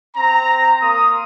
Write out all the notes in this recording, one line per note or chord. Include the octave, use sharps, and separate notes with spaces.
C4 A#5
A#3 C6 D#6